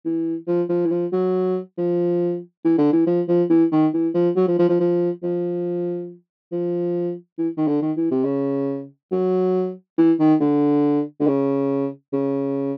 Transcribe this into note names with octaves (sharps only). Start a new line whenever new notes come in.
E3
F3
F3
E3
F3
F#3
F3
E3
D3
E3
F3
F3
E3
D#3
E3
F3
F#3
F3
F3
F3
F3
F3
F3
E3
D#3
D3
D#3
E3
C3
C#3
F#3
E3
D#3
D3
D3
C#3
C#3